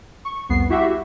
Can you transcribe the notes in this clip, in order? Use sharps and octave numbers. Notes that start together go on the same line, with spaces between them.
C#6
C2 F2 B3 C7
E4 F#4 G4 E5 F#5